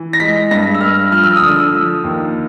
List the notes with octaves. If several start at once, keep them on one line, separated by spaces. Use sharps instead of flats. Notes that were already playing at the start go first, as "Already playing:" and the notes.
Already playing: E3
A#6
G#3 B6
G2 A#6
E6
G2 F6
F3 F6
E6
D#6
D3
E6
F3
D#2